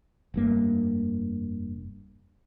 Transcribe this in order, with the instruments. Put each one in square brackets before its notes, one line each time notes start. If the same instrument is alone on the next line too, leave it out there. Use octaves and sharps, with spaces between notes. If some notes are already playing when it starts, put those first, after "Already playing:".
[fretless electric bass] F1 G2 A#3